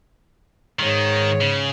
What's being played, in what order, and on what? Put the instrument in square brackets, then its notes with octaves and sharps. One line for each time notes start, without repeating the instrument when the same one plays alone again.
[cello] G#2 C#5 [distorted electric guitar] D#3
[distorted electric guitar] C#3